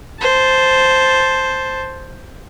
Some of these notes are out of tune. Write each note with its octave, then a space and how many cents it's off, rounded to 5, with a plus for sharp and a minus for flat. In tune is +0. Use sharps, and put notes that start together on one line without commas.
C5 +0 A5 -5